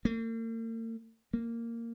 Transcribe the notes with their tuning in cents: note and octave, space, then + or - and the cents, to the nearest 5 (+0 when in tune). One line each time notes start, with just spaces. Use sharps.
A#3 -45
A#3 -10